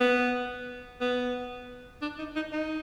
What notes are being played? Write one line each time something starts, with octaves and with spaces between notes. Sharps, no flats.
B3
B3
D4
D#4
D#4
D#4